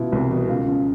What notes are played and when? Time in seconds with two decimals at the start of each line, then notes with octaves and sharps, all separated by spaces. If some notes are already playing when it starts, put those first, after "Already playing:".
Already playing: B2 E4 F4
0.12 C2
0.31 B2
0.49 C#2 F4
0.67 C#3 F3